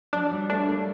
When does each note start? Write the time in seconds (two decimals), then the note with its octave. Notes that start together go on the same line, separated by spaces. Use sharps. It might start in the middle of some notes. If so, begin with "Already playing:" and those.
0.13 F#3 D4
0.31 G3
0.50 A3 D4
0.69 A#3